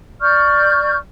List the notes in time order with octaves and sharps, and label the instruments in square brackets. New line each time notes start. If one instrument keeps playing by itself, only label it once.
[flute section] D5 C#6 F6 G6